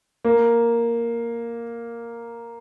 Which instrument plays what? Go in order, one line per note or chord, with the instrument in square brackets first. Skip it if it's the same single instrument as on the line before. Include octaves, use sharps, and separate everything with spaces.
[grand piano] A#3